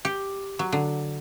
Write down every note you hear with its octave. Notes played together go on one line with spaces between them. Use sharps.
G4
F#3
D3